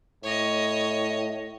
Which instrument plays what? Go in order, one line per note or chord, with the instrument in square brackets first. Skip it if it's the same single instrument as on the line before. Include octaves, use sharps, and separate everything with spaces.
[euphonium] A2 [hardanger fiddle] C#5 D#5